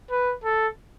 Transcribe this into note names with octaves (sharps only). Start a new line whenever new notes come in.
B4
A4